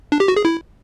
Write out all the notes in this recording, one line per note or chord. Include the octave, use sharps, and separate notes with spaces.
D4
G4
F#4
G#4
E4